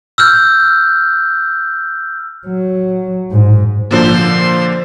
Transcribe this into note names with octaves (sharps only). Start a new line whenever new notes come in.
E6 F6 G6
F#3
G#2
A#2 D3 F3 C5 C6